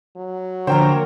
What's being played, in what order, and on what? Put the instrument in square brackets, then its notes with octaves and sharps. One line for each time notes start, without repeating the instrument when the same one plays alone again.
[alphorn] F#3
[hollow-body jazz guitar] D3 F3 [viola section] A#3 A#4 C#5 [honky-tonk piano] C5 G5